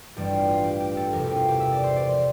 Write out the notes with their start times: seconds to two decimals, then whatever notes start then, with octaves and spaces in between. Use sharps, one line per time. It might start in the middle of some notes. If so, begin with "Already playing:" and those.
0.16 A1 G2 E3 G3 G4
0.33 F4
0.49 F4
0.64 G4
0.80 G4
0.97 A4
1.12 E1 E2 C3 A#4
1.24 G4
1.36 F4
1.48 G4
1.60 E5
1.72 D5
1.84 C5
1.96 D5
2.08 F3 C6